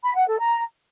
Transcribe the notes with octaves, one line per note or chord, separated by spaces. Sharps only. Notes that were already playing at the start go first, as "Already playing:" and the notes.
B5
F#5
A4
A#5